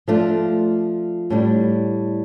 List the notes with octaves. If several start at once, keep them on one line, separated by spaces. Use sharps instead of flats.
F3 A3 D4 F4
A2 G3 D4